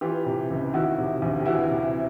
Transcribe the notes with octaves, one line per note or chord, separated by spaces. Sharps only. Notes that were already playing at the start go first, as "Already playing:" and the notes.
E3 F4 G4
C3
C#2
D#3 E4 F#4
C3
D2
G4
E3 E4 F#4
C3